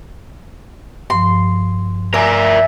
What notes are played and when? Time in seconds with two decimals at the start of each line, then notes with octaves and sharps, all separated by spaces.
1.10 G2 F3 C6
2.14 A#4 D5 E5 G#5 A#5